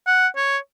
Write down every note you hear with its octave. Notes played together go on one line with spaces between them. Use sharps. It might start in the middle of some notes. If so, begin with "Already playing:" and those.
F#5
C#5